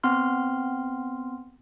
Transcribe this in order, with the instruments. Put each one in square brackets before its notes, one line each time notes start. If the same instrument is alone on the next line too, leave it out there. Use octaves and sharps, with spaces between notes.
[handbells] B3 C4 C6 F6